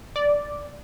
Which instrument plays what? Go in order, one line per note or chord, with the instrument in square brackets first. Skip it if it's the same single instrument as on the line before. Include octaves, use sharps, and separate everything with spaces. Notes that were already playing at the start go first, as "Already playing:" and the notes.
[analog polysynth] D5